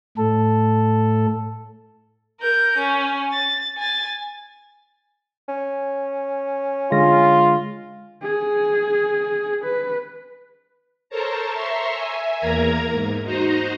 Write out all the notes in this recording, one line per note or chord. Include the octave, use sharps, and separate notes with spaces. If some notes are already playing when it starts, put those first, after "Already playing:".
A2 A4
A#4 G6
C#4
A6
G#5 A6
C#4
D3 G#3 F4 A#6
G#4
B4
A4 A#4 C5 C#5 A5 A#5
E5 A#5 C6 C#6
E5 G#5
E2 A#3 A#4 A#5 G#6
G#2
D#4 F#4 C5 D#5 A#5